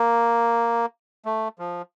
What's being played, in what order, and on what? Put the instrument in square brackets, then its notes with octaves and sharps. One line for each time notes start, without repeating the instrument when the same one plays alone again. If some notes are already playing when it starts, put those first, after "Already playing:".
Already playing: [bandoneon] A#3
A3
F3